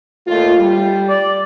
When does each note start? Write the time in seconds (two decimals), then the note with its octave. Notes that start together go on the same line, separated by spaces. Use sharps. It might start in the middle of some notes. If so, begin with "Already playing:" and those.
0.27 D#2 A3 F4
0.58 G3
1.09 D5